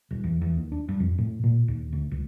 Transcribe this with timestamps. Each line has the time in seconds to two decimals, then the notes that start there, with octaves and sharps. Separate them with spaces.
0.11 D#1
0.24 E2
0.41 E2
0.57 D#2
0.72 D4
0.89 G2
1.00 F2
1.18 A2
1.44 A#2
1.68 D#2
1.92 D2
2.11 C#2